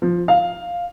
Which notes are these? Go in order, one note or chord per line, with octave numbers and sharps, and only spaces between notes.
F3
F5